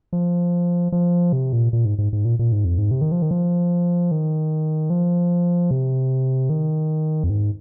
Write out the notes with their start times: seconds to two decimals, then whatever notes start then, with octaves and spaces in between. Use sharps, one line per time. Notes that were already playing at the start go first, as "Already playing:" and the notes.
0.13 F3
0.92 F3
1.33 C3
1.52 A#2
1.73 A#2
1.85 G#2
1.98 G#2
2.13 G#2
2.25 A#2
2.39 A#2
2.52 G#2
2.65 F2
2.78 G#2
2.91 C3
3.01 D#3
3.12 F3
3.22 D#3
3.31 F3
4.11 D#3
4.90 F3
5.71 C3
6.50 D#3
7.24 F2
7.30 G#2